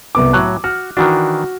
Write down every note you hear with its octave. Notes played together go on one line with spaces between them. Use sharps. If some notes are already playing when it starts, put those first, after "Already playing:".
C2 B3 D6
A2 F#3 F#6
F#4 F6
D#3 E3 D4 F#4